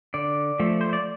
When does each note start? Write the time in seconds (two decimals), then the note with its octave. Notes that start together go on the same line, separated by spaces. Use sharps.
0.14 D3 D5
0.59 F3 A3
0.81 C5
0.93 D5